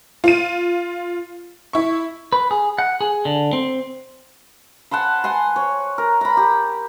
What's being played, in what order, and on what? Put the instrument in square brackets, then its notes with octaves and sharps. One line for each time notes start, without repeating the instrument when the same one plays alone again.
[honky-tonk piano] F4 D#7
E4 C#6
[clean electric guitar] B4
G#4
F#5
G#4
D3
C4
[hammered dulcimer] F#5 A5 B5 C6
F#5 G#5 C6
C#5
A#4
A#5 B5
G4